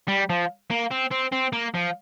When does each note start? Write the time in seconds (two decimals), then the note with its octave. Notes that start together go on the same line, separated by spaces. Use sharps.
0.08 G3
0.30 F3
0.71 A#3
0.91 C4
1.12 C4
1.32 C4
1.53 A#3
1.74 F3